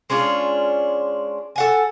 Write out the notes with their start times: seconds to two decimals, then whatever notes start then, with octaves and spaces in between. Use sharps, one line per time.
0.10 G#3 C#4 D4 F4
1.56 A4 F#5 G#5